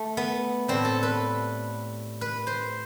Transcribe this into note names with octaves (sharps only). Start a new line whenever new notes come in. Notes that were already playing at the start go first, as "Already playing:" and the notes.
Already playing: A3
B3
A2 G3 C4
A4
B4
B4
C5